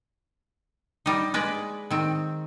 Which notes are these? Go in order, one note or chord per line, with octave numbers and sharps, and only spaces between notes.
G3 D#4
G#3 B4 D5
D#3 C4